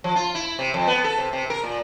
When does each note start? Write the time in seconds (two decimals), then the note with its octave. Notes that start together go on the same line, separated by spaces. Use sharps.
0.04 F3
0.16 F4
0.35 E4
0.59 C3
0.74 F2
0.88 B3
1.04 A4
1.18 C3
1.33 C3
1.50 A#4
1.63 A#2